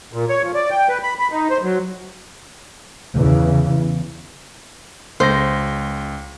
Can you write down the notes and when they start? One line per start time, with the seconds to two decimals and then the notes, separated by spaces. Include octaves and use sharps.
0.13 A#2
0.29 C#5
0.42 F3
0.54 D5
0.70 G5
0.89 B4
1.03 B5
1.19 B5
1.32 D#4
1.50 C5
1.62 F#3
3.16 E2 C#3 E3
5.20 C#2 C5 A#6